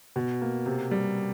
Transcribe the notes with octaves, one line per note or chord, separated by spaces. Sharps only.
B2
A#3
C3
G3